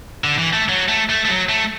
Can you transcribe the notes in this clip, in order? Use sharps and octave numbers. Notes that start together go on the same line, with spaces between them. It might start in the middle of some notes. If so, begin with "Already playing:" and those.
D3
E3
A3
F#3
A3
A3
A3
F#3
A3